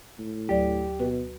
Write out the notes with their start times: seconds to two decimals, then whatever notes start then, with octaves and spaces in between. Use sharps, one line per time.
0.19 A2
0.49 D2 F#3 G4 D5
1.00 B2 F#4 B4